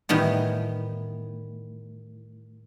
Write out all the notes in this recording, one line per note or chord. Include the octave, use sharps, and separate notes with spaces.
A2 D#3 E3 G3 B3